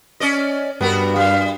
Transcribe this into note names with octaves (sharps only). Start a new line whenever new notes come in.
C#4 D5 D#5
G2 B3 F#4 A#4
G3 F5